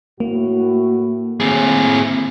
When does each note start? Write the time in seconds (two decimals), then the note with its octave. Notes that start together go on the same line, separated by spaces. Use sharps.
0.20 A2 A#3 F#4
1.40 A2 C4 G#4